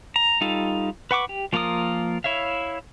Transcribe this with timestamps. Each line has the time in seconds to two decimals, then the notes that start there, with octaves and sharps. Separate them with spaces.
0.16 A#5
0.41 G3 D#4 F4 A4
1.11 B4 F#5 C#6 D6
1.29 G4
1.53 F3 A#3 F4 A#4 D#6
2.24 E4 C#5 E5 F5